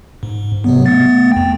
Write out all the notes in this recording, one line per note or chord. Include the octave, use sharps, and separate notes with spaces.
G#2
C3 F#3 B3
A3 B3 A6
F2 G5